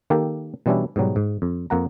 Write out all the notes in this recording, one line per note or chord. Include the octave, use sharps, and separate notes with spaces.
D#3 A#3 G4 A4
B2 E3 G3 C#4 D4 E4
G#2 B2 F#3 G3
G#2
F2
F2 A#3 F#5 A#5